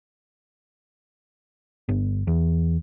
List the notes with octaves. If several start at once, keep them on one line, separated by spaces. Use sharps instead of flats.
G1
E2